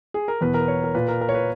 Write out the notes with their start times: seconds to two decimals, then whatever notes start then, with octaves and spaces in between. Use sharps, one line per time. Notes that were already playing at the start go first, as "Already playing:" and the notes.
0.14 G#4
0.28 A#4
0.41 E2 B2 B4
0.54 A#4
0.60 B4
0.68 C#5
0.84 A#4
0.95 A#2 B4
1.08 A#4
1.21 A#4
1.29 C#5
1.34 B4